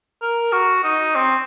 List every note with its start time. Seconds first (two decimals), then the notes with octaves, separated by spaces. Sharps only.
0.22 A#4
0.53 F#4
0.84 D#4
1.15 C4